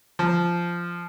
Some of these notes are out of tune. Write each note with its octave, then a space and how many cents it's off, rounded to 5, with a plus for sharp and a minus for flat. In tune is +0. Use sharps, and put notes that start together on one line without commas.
F3 -10